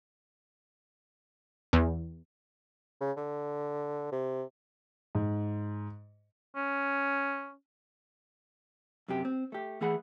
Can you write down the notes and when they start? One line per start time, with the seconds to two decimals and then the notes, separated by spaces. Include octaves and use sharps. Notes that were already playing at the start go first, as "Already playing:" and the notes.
1.73 E2
3.01 C#3
3.17 D3
4.12 C3
5.15 G#2
6.56 C#4
9.08 F#2 C3 G4
9.25 C4
9.52 A3 G4
9.81 E3 A3 G#4 F#5 B5